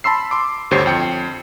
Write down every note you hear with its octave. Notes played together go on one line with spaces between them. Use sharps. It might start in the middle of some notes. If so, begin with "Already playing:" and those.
A5 B5 C6 E6 C7
C6 D6
G1 D2 G4 C5 C#5 C7
F2 G5 C#7